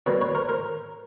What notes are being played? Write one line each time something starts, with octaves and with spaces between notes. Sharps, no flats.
B2 G3 A#3 B4 C#5
B4 C#5
A#4 C5
A#4 C5